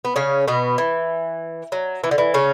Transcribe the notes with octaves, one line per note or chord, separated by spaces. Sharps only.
B3
C#3 C#4
B2 B3
E3
F#3
E3
D3
E3
C#3 C#4